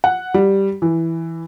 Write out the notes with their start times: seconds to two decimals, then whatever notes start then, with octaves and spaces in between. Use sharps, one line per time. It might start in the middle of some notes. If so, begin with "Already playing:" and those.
0.04 F#5
0.34 G3
0.82 E3